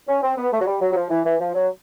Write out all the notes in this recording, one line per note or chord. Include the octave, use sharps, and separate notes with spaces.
C#4
C4
B3
A3
F#3
G3
F#3
F#3
F3
E3
E3
F3
F#3